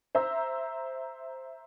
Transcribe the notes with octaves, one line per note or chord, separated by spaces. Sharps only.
C5 E5 A#5 E6